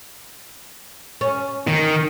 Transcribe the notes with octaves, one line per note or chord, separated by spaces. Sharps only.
C#4
D#3